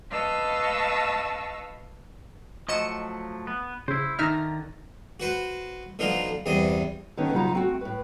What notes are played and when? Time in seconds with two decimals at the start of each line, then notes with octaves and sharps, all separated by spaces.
0.11 B4 D#5 F5 A5 C#6 E6
2.68 F3 F#3 A3 D#5 C#7 E7
3.47 B3
3.88 C#3 E4 C5
4.19 D3 D#3 D#4 E5 A#5 F6
5.20 F#4 B4 C5
5.99 B2 D3 F3 D#4 F4
6.46 E2 G2 C3 D#5
7.17 D3 D#3 B3 C#4 D#4
7.33 C#3 F#3 D#4 F4 F5 A#5
7.53 A3 C4 F#4
7.81 A2 B4